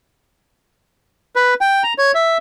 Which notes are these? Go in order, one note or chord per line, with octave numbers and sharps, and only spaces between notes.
B4
G5
A#5
C#5
E5